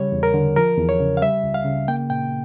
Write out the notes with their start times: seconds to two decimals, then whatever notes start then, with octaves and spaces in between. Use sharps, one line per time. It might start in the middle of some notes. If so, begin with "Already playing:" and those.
Already playing: C#3 G3 C#5
0.12 E2
0.23 A#4
0.34 D3
0.56 F3 A#4
0.78 E2
0.89 C#5
1.00 C#3
1.17 F5
1.22 G3 E5
1.44 C#2
1.54 F5
1.65 C#3
1.88 A#3 G5
2.10 A#2 G5